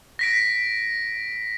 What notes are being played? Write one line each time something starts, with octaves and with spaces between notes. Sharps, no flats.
A#6 B6 D7